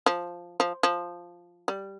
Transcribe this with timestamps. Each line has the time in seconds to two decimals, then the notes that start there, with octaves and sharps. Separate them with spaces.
0.06 F3
0.60 F3
0.83 F3
1.68 G3